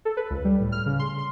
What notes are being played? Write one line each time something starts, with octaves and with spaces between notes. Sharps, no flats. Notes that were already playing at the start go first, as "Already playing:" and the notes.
A4
B4
C#2
G3
A2
F6
C#3
C6
C6